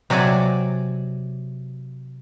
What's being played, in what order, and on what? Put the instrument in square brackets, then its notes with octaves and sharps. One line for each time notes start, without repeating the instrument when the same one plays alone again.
[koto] C3 F#3 F#4 D5 G#5